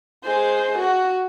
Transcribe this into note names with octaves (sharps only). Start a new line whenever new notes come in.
G#3 C5
F#4